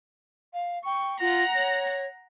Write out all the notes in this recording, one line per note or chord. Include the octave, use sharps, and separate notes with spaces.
F5
G5 C#6
F4 F#5 A#5
C#5